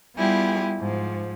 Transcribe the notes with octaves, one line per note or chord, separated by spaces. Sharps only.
G3 B3 E4 F4 G4 G#4
G#2 F3